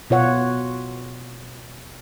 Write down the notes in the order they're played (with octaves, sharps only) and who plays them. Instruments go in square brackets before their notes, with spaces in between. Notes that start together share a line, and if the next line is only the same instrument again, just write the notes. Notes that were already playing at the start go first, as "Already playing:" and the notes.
[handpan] B2 F4 C#5 F#5